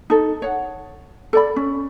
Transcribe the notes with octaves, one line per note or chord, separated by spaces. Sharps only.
D#4 A4
C#5 F#5
A4 D5 B5
C#4